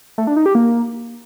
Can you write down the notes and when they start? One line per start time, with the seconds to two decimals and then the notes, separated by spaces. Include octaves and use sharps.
0.18 A3
0.27 D4
0.36 D#4
0.46 G4
0.55 A#3